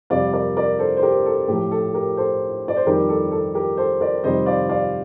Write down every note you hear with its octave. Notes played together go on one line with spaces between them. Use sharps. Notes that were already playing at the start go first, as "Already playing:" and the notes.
F2 C3 G3 D5 F5
A#4 D5
A#4 D5
A4 C5
C5
G4 A#4
A4
A2 F3 G4
A4
G4 A#4
A4 C5
D5
C5
F2 D#3 G3 G4 A#4
A4
A4
G4 A#4
A4 C5
A#4 D5
F2 C3 D#3 G3 C5 D#5
D5 F5
D5 F5